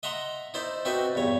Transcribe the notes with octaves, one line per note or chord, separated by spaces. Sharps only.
D#5 E5 F#5 A#5 C6
D#4 E4 C5 D5
C4 D#4 F#4 B4 D5 E5
E2 G2 C#5